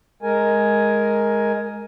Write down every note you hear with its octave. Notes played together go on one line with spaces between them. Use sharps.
G#3 A#4 G#5